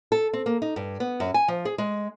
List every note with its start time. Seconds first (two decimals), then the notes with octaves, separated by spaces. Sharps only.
0.12 A4
0.33 C4
0.46 A#3
0.62 D#4
0.76 G2
1.00 B3
1.20 F#2
1.34 G#5
1.48 F3
1.65 G#4
1.78 G#3